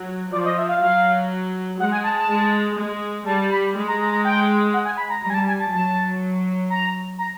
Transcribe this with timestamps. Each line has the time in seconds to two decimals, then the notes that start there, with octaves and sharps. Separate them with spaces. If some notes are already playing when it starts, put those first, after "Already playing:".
Already playing: F#3
0.32 F3 D5
0.45 D#5
0.58 E5
0.69 F5
0.81 F#3 F5
1.79 G#3 F#5
1.92 G#5
2.04 A5
2.16 A5
2.29 G#3
2.77 G#3
3.26 G3 A5
3.51 B5
3.76 G#3
3.88 A#5
4.01 A#5
4.12 A#5
4.25 G5
4.74 F#5
4.85 G#5
4.97 B5
5.10 A#5
5.23 G3 A#5
5.30 G#5
5.34 A5
5.47 G#5
5.60 A5
5.71 F#3 A5
6.70 A#5
7.18 A#5